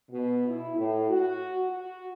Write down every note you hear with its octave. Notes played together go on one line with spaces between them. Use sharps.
B2
E4
A2
F#4
F#4